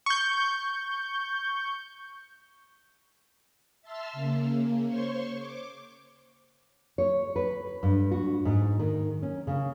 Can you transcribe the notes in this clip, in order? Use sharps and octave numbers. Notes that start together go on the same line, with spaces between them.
C#6 G6
E5 A5 C6 E6 F6
C#3 A#3
C5 C#5 C6 C#6
D6
C#5
B4
G2
F#4
G#2
D#3
C#4
C#3